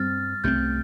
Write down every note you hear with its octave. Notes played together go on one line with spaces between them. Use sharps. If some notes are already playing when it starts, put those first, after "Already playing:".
Already playing: G2 G3 C4 F6 A6
C2 C3 A3 C4 G6